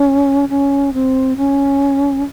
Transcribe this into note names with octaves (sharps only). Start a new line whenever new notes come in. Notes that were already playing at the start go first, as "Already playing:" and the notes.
Already playing: C#4
C#4
C4
C#4